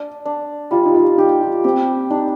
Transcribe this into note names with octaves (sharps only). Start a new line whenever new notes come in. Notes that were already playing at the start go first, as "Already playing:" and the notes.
Already playing: D4 D5
D4
G3 F4
D#4
F4
D#4 G4
F4
C4 G4
D4 D#4